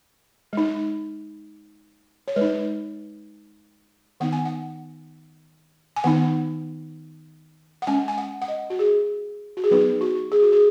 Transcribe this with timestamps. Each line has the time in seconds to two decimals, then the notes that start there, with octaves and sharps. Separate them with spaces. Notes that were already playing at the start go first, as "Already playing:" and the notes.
0.53 G#3 D#4
2.28 C#5
2.36 G#3 B4
2.41 D#4
4.20 D#3 B3 D#4 F#5
4.33 G#5
4.45 F#5
5.96 G#5
6.04 D#3 B3 D#4 F#5
7.82 F#5
7.87 G#3 C#4 G#5
8.08 G#5
8.18 F#5
8.42 F#5
8.48 D#5
8.70 F#4
8.79 G#4
9.57 F#4
9.64 G#4
9.71 F#3 B3 D#4 B4
10.01 F#4
10.32 G#4
10.42 F#4
10.52 G#4